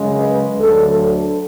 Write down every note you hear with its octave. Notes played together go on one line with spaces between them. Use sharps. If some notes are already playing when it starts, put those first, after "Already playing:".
Already playing: F#2 C#3 G#3
B4
D2 D3 F#3 A4
A4